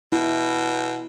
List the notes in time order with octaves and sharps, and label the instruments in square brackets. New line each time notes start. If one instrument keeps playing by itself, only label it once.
[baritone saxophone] B2 [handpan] E4